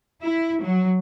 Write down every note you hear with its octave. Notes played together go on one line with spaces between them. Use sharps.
E4
F#3